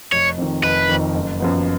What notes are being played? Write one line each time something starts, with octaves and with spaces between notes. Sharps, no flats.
F1 C#5
F2 D#3
F1 B4
F2 D#3
F#1
F#2 F3 B3